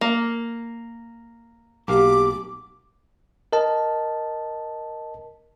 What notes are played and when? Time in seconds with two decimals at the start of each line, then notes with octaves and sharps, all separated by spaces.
0.01 A#3
1.88 B1 A#3 G4 F5 D6
3.53 A#4 D#5 A5